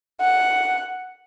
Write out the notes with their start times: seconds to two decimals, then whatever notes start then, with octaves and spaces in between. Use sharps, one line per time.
0.21 F#5